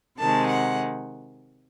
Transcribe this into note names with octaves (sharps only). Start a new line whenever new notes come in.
C3 D#3 G#3 A5
F#5